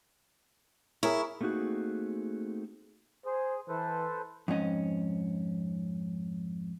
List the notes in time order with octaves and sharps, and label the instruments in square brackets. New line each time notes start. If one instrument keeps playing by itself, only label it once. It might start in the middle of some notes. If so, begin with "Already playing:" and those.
[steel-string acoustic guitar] E4 [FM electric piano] G#4 A#4 C#5
[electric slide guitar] A3 A#3 C4 D#4 F#4 G#4
[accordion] G#4 [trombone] C5
[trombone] E3 [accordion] A4 B4 C5
[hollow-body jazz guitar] F2 G#2 C#4 D#5